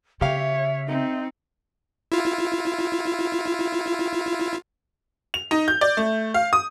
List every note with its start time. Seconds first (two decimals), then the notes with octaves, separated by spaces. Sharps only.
0.21 C#3 G4 C#5 E5 F5
0.87 C4 D#4
2.12 E4 F4
5.34 F7
5.51 D#4
5.68 G6
5.81 D5
5.97 A3
6.34 F5
6.53 D#6